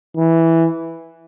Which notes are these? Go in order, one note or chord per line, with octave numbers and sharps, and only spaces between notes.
E3